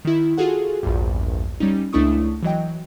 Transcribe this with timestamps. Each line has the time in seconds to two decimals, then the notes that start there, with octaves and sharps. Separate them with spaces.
0.05 D#3 E4
0.38 F4 F#4 G#4 A4 F#5
0.83 A#1 E2 G2
1.60 G3 C#4 D#4
1.93 C#2 A3 D4 E4 C#6 D#6
2.43 E3 F#3 D#5 G5